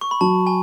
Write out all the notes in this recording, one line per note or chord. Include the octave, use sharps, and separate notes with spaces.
C#6
B5
F#3 A5
G#5